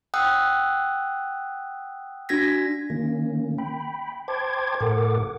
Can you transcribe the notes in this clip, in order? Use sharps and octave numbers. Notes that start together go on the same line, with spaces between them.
F#5 G5 D#6 E6 F#6
D4 F#4 G#6 A#6 B6
D#3 A#3 C#4
G5 B5
C5 G5 A5 C6 D6 G#6
A2 A4 A#4 F#5 D6